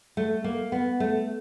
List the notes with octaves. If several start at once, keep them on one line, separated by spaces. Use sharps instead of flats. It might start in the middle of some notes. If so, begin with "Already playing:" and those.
A3
A#3
B3
A3